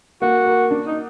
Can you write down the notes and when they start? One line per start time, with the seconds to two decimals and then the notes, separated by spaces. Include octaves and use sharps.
0.21 A#3 F#4
0.46 A#4
0.71 D4
0.86 D#4